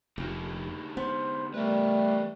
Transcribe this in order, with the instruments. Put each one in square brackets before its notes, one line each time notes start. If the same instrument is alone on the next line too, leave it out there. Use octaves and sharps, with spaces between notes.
[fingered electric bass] F1 [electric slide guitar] D3 D#4 G4
[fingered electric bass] B3 [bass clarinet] C5
[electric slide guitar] E3 A#4 B4 [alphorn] G3 [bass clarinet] A3